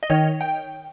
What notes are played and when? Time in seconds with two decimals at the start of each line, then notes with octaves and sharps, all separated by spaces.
0.03 D#5
0.10 D#3 C#5
0.41 G5